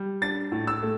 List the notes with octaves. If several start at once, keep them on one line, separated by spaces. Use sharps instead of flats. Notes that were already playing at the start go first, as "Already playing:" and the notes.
Already playing: G3
D4 A6
A2
E6
A3